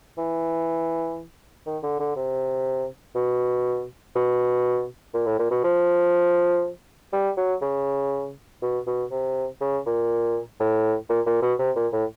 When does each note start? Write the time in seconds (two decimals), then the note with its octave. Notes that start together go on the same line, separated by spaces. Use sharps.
0.18 E3
1.66 D#3
1.83 D3
2.00 D3
2.16 C3
3.15 B2
4.16 B2
5.14 A#2
5.26 A2
5.39 A#2
5.51 B2
5.64 F3
7.13 G3
7.37 F#3
7.62 C#3
8.62 B2
8.87 B2
9.11 C3
9.61 C#3
9.86 A#2
10.60 A2
11.09 A#2
11.26 A#2
11.42 B2
11.59 C3
11.76 A#2
11.93 A2